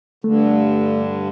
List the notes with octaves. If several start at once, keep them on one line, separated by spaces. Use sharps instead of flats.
G2 D3 A3